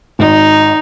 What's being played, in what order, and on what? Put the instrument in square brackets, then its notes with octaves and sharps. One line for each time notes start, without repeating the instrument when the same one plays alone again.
[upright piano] G#1 D#5 [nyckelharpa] D#4